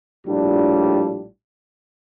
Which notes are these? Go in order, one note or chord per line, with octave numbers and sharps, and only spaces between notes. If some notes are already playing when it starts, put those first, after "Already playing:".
A#1 A2 G3 D4 F4